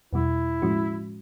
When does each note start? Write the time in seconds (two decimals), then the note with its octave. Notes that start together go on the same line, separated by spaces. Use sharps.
0.13 E2 B2 G3 E4
0.62 A2 F3 G#3 C#4 F#4